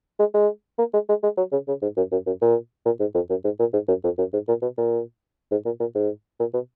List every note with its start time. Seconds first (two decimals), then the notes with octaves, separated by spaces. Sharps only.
0.19 G#3
0.34 G#3
0.79 A#3
0.94 G#3
1.09 G#3
1.23 G#3
1.37 F#3
1.52 C#3
1.68 C#3
1.82 G#2
1.97 F#2
2.12 F#2
2.26 F#2
2.42 A#2
2.86 A#2
3.00 G#2
3.15 F2
3.30 F#2
3.44 G#2
3.60 A#2
3.73 G#2
3.88 F#2
4.04 F2
4.18 F#2
4.33 G#2
4.48 A#2
4.62 B2
4.77 A#2
5.51 G#2
5.65 A#2
5.80 A#2
5.95 G#2
6.40 A#2
6.54 B2